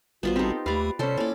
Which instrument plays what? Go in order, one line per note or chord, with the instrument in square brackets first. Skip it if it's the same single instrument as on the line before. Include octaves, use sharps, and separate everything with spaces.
[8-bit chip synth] A1 G3 [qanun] B3 F4 C5 [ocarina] F#4
[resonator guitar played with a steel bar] C4 A4 [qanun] D#4 G4
[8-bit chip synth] D#2 A3 [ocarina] G4 [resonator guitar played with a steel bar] B4 [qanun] D5 F5
[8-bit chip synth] C3 [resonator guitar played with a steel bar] G3 C#4 [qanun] A4 C5 [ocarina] C#5
[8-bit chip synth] A#3 E4 [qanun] C#4 D5 [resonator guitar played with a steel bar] A4 C5